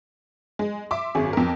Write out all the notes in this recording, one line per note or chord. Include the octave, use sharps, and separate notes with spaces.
G#3
E5 C6 D6
G#1 F#2 G#4
F2 A#4